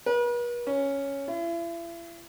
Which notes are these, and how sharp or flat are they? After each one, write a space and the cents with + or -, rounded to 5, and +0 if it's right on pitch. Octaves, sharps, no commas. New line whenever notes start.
B4 -45
C#4 +0
E4 +40